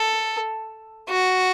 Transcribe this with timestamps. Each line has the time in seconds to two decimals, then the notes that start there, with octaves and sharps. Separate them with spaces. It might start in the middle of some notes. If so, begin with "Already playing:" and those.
Already playing: A4
1.10 F#4